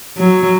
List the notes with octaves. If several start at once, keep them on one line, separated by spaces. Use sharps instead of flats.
F#3